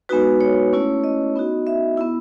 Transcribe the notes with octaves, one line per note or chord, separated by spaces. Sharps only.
G#3 B3 D#4 F#4 B4
C#5
A3 C#4 E4
D#5
B3 D#4 F#4
E5
B3 E4